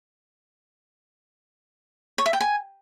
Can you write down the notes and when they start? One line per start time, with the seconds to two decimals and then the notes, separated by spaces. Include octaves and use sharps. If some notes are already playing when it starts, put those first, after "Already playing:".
2.18 C#5
2.26 E5
2.33 G5
2.41 G#5